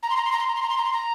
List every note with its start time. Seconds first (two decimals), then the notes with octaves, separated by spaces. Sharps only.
0.02 A#5
0.10 C6
0.16 A#5
0.25 C6
0.32 A#5
0.39 C6
0.48 A#5
0.55 C6
0.62 A#5
0.69 C6
0.77 A#5
0.84 C6
0.92 A#5